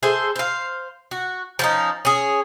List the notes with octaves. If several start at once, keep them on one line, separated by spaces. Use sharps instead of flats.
G#4 A4 C5 E5
C5 F5
F#4
F3 C#4 D#4
C#4 G#4